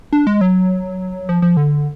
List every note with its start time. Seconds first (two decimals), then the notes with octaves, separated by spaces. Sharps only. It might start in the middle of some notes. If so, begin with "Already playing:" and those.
0.13 D4
0.27 G#3
0.41 F#3
1.29 F3
1.42 F3
1.57 D3